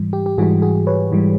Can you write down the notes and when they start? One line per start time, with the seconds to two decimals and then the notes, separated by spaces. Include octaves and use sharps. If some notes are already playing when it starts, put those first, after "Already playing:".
Already playing: G#2 E3 G3
0.13 G4
0.26 G4
0.38 G#2 E3 G3 F#4 G#4
0.62 F#4 G#4
0.87 B4 C#5
1.12 G#2 E3 G3